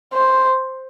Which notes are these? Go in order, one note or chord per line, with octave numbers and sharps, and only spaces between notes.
C5